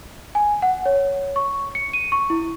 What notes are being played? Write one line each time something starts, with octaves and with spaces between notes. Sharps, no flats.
G#5
F#5
C#5
C#6
C#7
D#7
C#6
E4